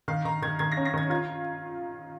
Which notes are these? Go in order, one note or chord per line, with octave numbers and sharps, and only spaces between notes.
D#3 F5
D#3 A#5
D#3 G#6
D#3 G#6
A#6
C#4
A#6
D#3 G#6
F4 G#6